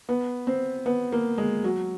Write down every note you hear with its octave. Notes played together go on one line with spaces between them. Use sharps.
B3
C4
B3
A#3
G#3
F#3